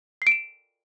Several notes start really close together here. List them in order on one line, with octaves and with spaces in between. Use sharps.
C7 D7 E7